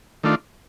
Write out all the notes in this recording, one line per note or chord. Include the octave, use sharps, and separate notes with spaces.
D#3 A3 D4 F4